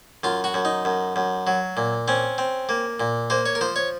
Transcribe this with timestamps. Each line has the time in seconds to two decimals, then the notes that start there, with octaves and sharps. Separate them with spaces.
0.24 F#2 F4
0.44 F#4
0.54 F#2
0.65 D#4
0.85 F#2
1.16 F#2
1.47 F#3
1.77 A#2
2.08 C4 C#4
2.38 C4
2.69 A#3
3.00 A#2
3.30 A#3 C5
3.46 C#5
3.55 A#4
3.61 F3 C5
3.76 C#5